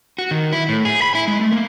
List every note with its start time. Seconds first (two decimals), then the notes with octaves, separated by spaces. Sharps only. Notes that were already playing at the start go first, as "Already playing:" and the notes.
0.18 F#4
0.31 D#3
0.52 E4
0.69 A2
0.85 G#4
1.02 B5
1.15 E4
1.28 G#3
1.41 A3
1.52 A#3